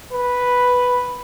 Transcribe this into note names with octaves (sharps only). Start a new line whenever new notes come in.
B4